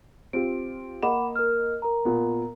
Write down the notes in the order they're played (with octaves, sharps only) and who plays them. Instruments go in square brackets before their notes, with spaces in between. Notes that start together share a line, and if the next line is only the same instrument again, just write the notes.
[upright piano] C4 F4 G4 [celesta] D7
[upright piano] A#3 D#5 E7 [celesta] F#5 B5 D6
[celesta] A#4 F6
A#4 A#5
[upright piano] A#2 B3